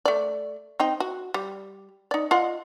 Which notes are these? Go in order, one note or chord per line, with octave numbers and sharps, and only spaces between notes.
A3 D5
C4 D#4 G5
F#4
G3
D#4 D5
F4 D#5 F#5